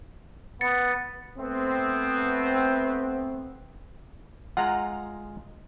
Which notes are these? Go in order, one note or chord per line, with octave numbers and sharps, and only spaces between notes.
B3 A6 C#7
A3 B3 C4
G#3 F4 F#5 A#5